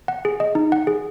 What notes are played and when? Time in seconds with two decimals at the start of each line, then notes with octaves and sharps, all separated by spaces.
0.08 F#5
0.25 G#4
0.40 D#5
0.55 D#4
0.72 F#5
0.87 G#4